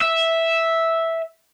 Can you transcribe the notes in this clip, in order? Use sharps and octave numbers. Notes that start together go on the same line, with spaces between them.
E5